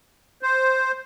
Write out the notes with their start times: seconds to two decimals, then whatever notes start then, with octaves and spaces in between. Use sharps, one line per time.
0.42 C5